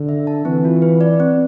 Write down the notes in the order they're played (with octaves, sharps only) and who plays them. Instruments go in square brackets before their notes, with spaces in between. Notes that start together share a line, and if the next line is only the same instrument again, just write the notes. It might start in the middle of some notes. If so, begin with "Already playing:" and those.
Already playing: [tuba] D3
[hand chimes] E5
A5
[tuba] E3 [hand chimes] C4
[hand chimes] F4
B4
D5
C4